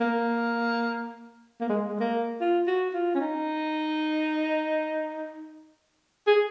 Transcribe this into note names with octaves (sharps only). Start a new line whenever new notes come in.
A#3
A#3
G#3
G#3
A#3
F4
F#4
F4
C#4
D#4
G#4